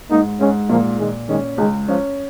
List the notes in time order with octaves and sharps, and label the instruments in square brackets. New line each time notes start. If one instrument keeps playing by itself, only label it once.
[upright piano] G#2 [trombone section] A#3 D#4
[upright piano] G#2 [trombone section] G#3 C#4
[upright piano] A#2 [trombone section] F3 A#3
[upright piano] A#2 [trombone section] D#3 G#3
[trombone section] D#3 G#3 [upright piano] C#4
[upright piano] C#2 [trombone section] D#3 G#3
[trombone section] C#3 F3 [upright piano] C#4